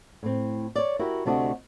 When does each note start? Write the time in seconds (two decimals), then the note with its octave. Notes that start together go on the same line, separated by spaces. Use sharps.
0.23 A2 C4
0.75 C#5 D5
0.99 E4 F#4 G4 A#4
1.25 D2 C3 A3 D4 F#4 D#5